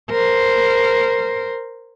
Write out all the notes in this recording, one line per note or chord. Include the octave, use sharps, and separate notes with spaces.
A#4 C5